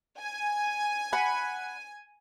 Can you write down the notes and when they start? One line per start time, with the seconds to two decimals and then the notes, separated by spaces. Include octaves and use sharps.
0.20 G#5
1.13 F#5 B5